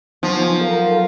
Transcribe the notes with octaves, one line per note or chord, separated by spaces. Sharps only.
F3 F#3 B3 D#4 G#5
A4 A#4 F5 A#5